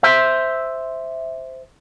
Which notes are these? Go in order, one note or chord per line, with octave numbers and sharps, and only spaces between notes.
C5 E5